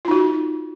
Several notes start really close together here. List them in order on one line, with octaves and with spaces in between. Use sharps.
F4 D#4 F#4